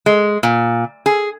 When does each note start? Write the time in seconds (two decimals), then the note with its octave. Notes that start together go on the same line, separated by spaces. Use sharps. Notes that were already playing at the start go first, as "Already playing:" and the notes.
0.06 G#3
0.43 A#2
1.06 G#4